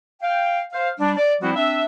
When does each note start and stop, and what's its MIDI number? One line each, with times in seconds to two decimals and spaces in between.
0.22 0.61 77
0.22 0.61 79
0.73 0.90 72
0.73 0.90 77
1.00 1.16 55
1.00 1.16 62
1.17 1.34 74
1.42 1.54 53
1.42 1.54 55
1.42 1.54 60
1.42 1.54 64
1.42 1.54 66
1.55 1.84 60
1.55 1.84 62
1.55 1.84 76